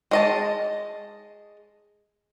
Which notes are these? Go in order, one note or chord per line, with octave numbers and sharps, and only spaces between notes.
G#3 D#5 A5